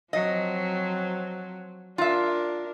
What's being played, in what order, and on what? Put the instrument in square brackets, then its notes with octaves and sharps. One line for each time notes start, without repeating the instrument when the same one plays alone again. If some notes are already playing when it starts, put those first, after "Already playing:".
[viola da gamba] F3 F#3 C4 [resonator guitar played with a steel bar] D#5
[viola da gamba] D4 A#4 [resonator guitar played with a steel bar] F4 E5